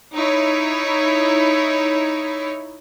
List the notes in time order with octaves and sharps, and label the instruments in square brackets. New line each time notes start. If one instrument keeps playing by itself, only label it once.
[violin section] D#4 E4 C#5